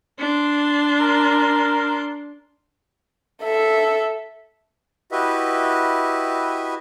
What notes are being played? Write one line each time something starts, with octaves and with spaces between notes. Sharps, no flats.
D4 C6
A#4
A4 E5
E4 F#4 G4 B4 D#5 E5